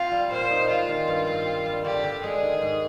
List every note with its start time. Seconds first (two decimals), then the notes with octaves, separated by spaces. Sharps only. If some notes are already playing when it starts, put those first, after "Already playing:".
Already playing: C4 F4
0.11 G3
0.31 A#2 C5
0.50 D#4
0.69 G#3 F4
0.89 D#3
1.08 G2
1.27 C4
1.47 C4
1.66 G3
1.84 D3 G4
2.04 D3
2.23 G#3 G#4
2.43 D#3
2.62 G#2